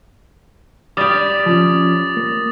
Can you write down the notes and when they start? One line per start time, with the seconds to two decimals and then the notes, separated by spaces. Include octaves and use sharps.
0.97 G3 G4 D6 D#6 A6
1.46 F3 C#4
2.17 A#3